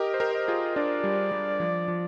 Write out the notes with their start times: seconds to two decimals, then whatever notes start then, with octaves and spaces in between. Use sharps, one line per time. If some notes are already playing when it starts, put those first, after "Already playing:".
Already playing: G4 A#4 D#5
0.14 C5
0.20 G4 A#4
0.34 D#5
0.48 F4 G#4
0.76 D4 F4 D5
1.04 G3
1.32 G3
1.60 F3
1.88 F3